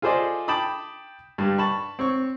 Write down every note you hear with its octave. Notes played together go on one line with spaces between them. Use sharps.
F4 G#4 A4 C5 D5 D#5
G5 A5 B5 D6 D#6
G2 G3
A5 B5 C#6
C4 C#5 C#6